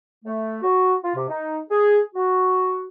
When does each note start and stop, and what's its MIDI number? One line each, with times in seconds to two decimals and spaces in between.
0.24 0.58 57
0.62 0.94 66
1.03 1.12 65
1.15 1.26 48
1.29 1.58 63
1.69 1.99 68
2.15 2.83 66